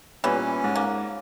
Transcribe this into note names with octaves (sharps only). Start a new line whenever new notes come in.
A#2 E3 G3 B3 C#4
G#2
A#3